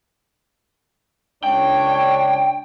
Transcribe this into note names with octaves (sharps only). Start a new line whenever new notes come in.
C#2 D4 C#5 G5